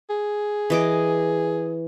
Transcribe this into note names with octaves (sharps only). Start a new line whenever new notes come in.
G#4
E3 D#5 D6